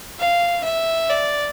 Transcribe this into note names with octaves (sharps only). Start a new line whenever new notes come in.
F5
E5
D5